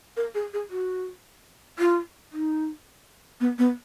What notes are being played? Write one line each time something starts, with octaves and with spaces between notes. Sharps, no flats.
A#4
G#4
G#4
F#4
F4
D#4
B3
B3